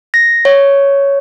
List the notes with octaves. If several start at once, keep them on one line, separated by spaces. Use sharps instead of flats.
A#6
C#5